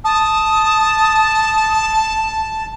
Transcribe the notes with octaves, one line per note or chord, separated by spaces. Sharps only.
A5 D#6